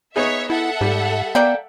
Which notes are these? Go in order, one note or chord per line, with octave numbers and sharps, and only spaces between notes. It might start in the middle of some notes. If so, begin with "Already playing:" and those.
B3 D#4 G#4 C#5 E5
E4 A4 E5 F#5
G#2 G3
A#3 B3 D5 G5